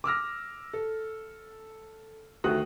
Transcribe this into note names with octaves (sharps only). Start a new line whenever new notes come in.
D6 E6 F6 A#6
A4
D2 D#3 A3 F#4 D#6 F#6